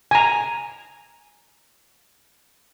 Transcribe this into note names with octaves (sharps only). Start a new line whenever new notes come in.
G#5 A#5